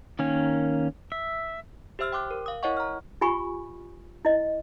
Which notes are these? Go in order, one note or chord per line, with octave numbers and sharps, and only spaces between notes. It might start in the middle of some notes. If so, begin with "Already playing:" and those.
D#3 A#3 C#4
E5
G4 C5 E5 E6 F6
G5 C6 D6 F#6
A#4
F5 D#6
E4 A#4 C#5 D#5 F#5 C#6
A#5 F6
F4 G4 G#5 B5 C#6
E4 D#5